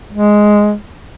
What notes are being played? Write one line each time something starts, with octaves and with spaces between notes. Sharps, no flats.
G#3